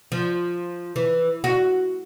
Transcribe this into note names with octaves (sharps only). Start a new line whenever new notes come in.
F3
E3
F#4